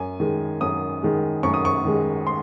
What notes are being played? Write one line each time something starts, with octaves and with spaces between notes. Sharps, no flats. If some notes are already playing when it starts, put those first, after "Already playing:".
Already playing: F#2 G#5
D#3 G#3
F#2 D#6
D#3 G#3
F#2 C#6
D#6
C#6
D#3 G#3
C6